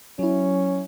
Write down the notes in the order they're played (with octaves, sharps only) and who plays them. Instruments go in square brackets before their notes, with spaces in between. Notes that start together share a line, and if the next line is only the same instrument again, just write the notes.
[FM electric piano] F#3 E4 [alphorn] C#4